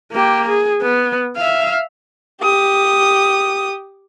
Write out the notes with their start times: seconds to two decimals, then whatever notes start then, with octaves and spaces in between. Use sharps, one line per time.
0.12 A#3 G4
0.49 G#4
0.82 B3
1.37 E5 F5
2.42 G4 D#6